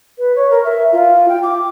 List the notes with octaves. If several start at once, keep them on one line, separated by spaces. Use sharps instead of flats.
B4
C#5
A#4
E5
F4
G5
D6